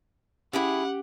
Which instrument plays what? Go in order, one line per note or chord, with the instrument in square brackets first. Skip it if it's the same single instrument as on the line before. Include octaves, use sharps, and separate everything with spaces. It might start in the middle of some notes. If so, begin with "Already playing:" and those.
[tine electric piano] C#4 [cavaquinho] E4 G#4 E5 [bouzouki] G4 [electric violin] F#5